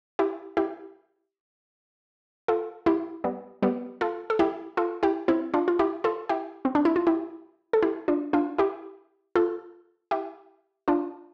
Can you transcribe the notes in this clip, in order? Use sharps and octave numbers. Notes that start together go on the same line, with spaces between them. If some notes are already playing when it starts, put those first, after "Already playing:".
E4 G4
E4 G4
F4 A4
E4 G4
G3 B3
G3 B3
F4 A4
A4
E4 G4
F4 A4
E4 G4
C4 E4
D4 F4
F4
E4 G4
F4 A4
E4 G4
C4
D4
E4
F4
E4 G4
A4
E4 G4
D4 F4
D4 F4
E4 G4
F4 A4
E4 G4
D4 F4